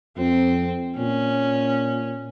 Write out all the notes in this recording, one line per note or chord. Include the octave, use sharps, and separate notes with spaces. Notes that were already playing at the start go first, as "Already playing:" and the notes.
F2 C4
A#2 C#4